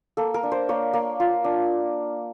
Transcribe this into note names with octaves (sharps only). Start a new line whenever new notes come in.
A#3 A4
A#4
D4
C5
A#3 C#5
A#3
F4
D4